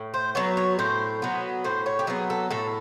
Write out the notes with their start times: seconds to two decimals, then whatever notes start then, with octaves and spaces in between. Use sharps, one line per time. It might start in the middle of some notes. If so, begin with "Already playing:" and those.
Already playing: A2
0.14 C5
0.35 F#3 B3 C#5
0.57 C#5
0.79 A2 C5
1.22 F#3 B3
1.64 A2 C5
1.86 C#5
1.99 G4
2.07 F#3 B3 G#4
2.30 A4
2.50 A2 A4